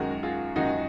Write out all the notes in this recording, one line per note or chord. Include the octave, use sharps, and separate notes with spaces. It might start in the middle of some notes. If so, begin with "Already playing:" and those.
Already playing: F#2 D#3 G#3 F#4 A#4
F4 G#4
F#2 D#3 G#3 D#4 F#4